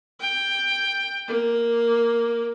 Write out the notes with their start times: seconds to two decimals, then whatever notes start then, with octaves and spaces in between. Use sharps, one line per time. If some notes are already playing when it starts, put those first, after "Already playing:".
0.20 G5
1.28 A#3